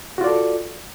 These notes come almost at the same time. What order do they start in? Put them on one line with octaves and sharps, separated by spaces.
F#4 F4 D5 A4